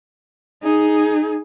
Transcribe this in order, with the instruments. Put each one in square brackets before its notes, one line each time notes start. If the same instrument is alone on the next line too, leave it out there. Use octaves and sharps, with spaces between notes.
[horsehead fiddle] D#4 G#4